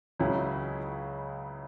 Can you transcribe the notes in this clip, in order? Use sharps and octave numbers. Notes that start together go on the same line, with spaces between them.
C#2 C#3 F#3 C#4 E4